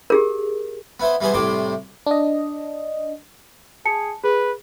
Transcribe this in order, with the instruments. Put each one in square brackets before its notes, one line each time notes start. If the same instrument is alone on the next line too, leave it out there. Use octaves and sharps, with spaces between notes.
[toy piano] G4 G#4 A#4
[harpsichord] B3 E4 C5
E3 G3 B3 G#4 C5
C2 A2 C3 C5 G5 D6
[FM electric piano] D4 D#5
[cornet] G#4 [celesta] A5 C#7
[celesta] G#4 [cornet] B4